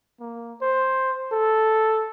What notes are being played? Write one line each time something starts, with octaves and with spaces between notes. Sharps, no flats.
A#3
C5
A4